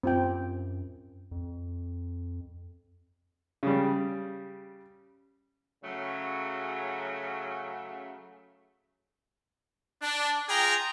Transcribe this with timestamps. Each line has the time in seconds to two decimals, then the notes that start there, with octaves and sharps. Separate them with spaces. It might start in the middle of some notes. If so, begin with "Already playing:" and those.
0.03 F#2 C4 F4 G5
1.31 F2
3.63 C#3 G3
5.84 C#3 F#3 A3
10.02 D4
10.49 F4 G#4 G5 A#5